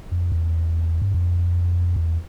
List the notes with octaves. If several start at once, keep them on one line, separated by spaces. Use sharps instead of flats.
F2
E2
G2
F2
E2